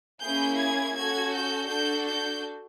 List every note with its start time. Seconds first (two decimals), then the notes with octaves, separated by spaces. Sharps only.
0.21 A#3 C#4 E4 G#4 G6
0.58 G#6
0.95 C#4 F#4 A4 G#6
1.32 G6
1.68 D4 F#4 A4 G6
2.05 G6